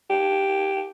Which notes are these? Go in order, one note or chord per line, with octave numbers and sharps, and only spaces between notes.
G4